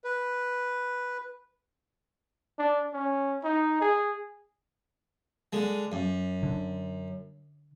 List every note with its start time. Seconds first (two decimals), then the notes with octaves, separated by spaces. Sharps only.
0.04 B4
2.59 D4
2.93 C#4
3.44 D#4
3.81 G#4
5.53 D3 G#3
5.92 F#2
6.43 D3